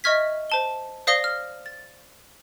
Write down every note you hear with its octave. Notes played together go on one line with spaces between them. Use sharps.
D#5 E5 C#6 F6 G#6 B6
C5 A5 G7
C5 D5 F5 D#6 A#6 G7
F6
A6